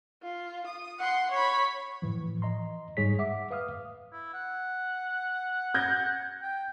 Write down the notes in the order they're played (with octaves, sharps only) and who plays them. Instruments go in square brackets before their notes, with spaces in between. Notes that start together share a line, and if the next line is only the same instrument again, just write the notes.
[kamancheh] F4
D#6
F#5 C6
C#5 B5
[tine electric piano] A2 E3 F3
D#5 A#5 C6
G#2 G3 G#4 C#5 B6
E5 F#5 D6
B4 F5 D#6 F6
[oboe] E4
F#5
[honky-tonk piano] G6 G#6 A#6
[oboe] G5